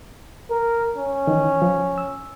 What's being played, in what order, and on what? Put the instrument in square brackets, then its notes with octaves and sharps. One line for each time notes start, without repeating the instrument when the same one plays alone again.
[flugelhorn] A#4
C#4
[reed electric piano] D#3 E3
F3
E6